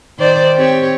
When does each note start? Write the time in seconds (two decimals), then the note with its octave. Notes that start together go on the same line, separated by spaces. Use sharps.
0.18 D#3 C5 D5
0.55 C4 G4 C#5